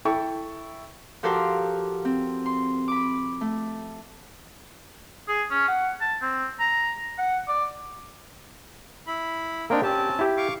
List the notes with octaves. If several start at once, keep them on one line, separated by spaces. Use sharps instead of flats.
E4 A4 G5 C#6
F3 F#4 G4 A4 A#4 C5
C4
C6
B5 D6
A3
G#4
C#4
F#5
A5
C4
A#5
F#5
D5
E4 B5
A#3 C4 D4 D#4 A#4 G5
C4 C#4 G4 A5
E4 G4
F5 C#6 D6